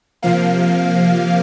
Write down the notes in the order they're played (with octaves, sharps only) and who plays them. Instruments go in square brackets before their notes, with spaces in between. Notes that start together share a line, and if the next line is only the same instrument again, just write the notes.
[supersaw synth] C3 F3 A#3 F5